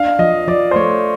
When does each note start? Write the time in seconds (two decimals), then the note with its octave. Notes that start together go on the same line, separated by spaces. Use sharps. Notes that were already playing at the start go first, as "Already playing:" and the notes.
Already playing: D4 F5
0.19 F3 D#5
0.48 F3 D5
0.71 C5
0.76 A3 C#5